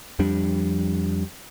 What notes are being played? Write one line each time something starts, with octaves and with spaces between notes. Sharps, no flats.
F2 F3 G3 D4